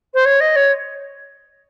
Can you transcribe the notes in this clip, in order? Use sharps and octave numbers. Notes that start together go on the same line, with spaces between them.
C5
C#5
D#5
C#5